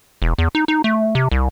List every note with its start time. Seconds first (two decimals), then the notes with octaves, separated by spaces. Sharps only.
0.22 E1
0.38 E2
0.55 D#4
0.68 D#4
0.84 A3
1.15 C3
1.32 C2